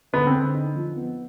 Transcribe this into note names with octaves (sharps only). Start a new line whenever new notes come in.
D3 B3
C4
D3
D#4
F3
B3